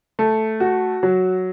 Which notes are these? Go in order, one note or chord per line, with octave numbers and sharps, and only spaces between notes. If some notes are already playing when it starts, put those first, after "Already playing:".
A3
F#4
F#3